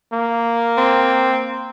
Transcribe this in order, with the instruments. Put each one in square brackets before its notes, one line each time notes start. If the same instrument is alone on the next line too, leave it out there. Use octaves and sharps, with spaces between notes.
[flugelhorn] A#3
[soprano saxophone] C4